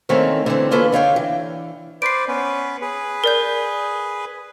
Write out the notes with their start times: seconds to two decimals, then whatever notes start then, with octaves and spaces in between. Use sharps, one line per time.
0.09 D#3 E3 A3 A#3 C4 C#4
0.46 D3 E3 C4
0.71 A#3 C#4 F4 A4 B4
0.92 D3 C#5 F5 G5
1.16 E3
2.02 B4 C5 D5 C7 D7
2.28 B3 C#4 B4
2.82 G#4 B4
3.24 A#4 D5 G6